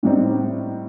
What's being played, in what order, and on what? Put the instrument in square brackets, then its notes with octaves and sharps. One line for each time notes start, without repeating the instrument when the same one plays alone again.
[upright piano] A2 G3 C4 D#4